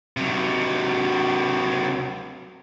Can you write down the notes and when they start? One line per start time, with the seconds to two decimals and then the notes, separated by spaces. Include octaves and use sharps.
0.17 C3 F#3